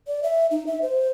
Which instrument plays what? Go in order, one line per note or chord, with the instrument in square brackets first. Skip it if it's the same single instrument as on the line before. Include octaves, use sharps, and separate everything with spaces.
[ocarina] D5
E5
D#4
E5
C5